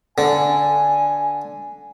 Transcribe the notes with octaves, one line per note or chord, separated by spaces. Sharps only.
D3 G#5